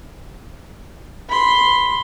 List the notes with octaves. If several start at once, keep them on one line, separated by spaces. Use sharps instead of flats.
B5 C6